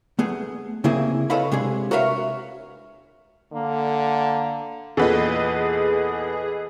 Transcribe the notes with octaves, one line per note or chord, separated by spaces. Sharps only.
A3 B3 G#4
C#3 A#3 C4 E4 G#4
A4 B4 C#5 D#5 F5 B5
C3 G#3 D4 G#4
F#4 A#4 B4 C#5 E5 F5
D3 A#3
E2 A#2 G#4 A4 B4 D#5